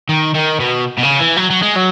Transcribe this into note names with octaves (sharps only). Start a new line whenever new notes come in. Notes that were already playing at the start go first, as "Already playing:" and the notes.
D#3
D#3
B2
B2
C#3
E3
F#3
F#3
G#3
F#3